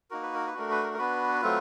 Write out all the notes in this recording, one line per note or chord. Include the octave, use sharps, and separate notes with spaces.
A#3 D#4 F#4 A#4
B4
A#4
B4
A3 D4 F#4 A#4
B4
A#4
A#4
B3 D4 F#4 B4
F#3 A3 C4 F4